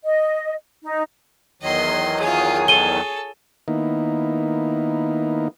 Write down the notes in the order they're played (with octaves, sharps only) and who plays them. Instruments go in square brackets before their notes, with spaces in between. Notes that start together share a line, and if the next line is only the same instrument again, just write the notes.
[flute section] D#5
D#4
[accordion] E2 D#3 F#3 [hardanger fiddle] D#5 C6
[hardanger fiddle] F4 D#6 [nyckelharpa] G#4 C#5
[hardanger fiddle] A4 [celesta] D#7 G7
[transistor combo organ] D#3 A#3 B3 D#4 E4